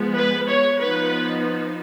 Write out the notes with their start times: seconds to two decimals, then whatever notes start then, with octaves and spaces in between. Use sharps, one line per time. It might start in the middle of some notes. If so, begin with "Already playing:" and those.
Already playing: F3 G#3 B3
0.17 B4
0.50 C#5
0.81 F3 B3 D#4 B4